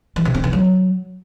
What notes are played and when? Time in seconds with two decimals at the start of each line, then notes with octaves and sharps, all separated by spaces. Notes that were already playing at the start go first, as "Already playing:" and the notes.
0.16 E3
0.25 C3
0.34 C4
0.44 E3
0.53 F#3